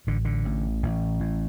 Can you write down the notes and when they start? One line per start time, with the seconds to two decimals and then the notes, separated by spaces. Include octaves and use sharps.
0.07 A1 D3
0.25 D3
0.45 A1
0.83 A1
1.20 A2